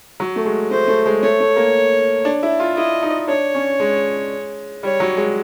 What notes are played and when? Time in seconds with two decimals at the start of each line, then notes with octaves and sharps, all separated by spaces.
0.20 F#3
0.36 A3
0.45 G#3
0.71 A3 C5
0.88 A3
1.06 G#3
1.23 A3 C#5
1.40 A3
1.56 A#3
2.25 D4
2.43 E4
2.60 F4
2.76 E4 D#5
3.02 D#4
3.28 D4 C#5
3.55 C#4
3.80 G#3
4.83 G3 C#5
5.00 F#3
5.17 G#3